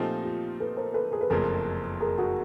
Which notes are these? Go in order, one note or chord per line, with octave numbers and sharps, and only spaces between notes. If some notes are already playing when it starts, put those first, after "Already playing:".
Already playing: A#2 F3 A3 C4 D#4 F4 G4
F4 G4
A4 B4
A#4 C5
A4 B4
G#4 A#4
B4
F#1 F2 C#3 F3 A3 G#4 A#4
G#4 A#4
F#4 G#4